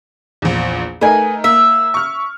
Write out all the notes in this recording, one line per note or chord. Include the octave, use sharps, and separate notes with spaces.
A#1 E2
A3 D#4 A#4 B4 G#5
A#3 E5
C#6 F6